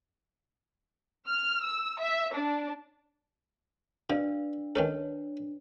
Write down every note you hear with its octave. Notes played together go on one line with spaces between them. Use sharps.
F6
E6
E5
D4
B2 D4 B4 D5 F5
D#3 C#4 A4 B4 C#5 A5